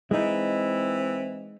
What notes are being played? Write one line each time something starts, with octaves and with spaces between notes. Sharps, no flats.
E3 G#3 C4 D#4 E4